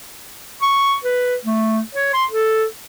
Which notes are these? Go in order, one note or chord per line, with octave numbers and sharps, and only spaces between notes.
C#6
B4
A3
C#5
C6
A4